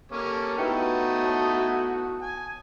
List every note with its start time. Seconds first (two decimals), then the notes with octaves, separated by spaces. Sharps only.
0.12 A#3 C#4 G4 A4 C#5
0.58 A3 B3 D#4 E4 F#4 B4 G5 C#7
1.23 C#5 A5 D#6
2.22 G#5